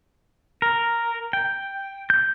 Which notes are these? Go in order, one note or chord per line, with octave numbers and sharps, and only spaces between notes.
A#4
G5
G6